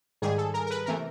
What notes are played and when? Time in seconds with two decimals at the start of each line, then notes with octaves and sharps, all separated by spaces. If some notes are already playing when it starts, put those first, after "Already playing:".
0.22 G#2 D#3 G3 G#4
0.38 A4
0.54 A#4
0.67 A#4
0.71 B4
0.86 C3 E3 A3 A#4